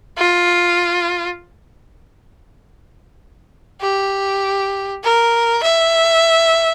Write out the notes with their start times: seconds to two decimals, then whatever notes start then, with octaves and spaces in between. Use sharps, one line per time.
0.18 F4
3.81 G4
5.03 A#4
5.63 E5